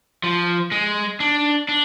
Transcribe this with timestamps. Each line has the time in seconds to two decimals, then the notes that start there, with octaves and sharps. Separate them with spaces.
0.23 F3
0.72 G#3
1.20 D4
1.69 D4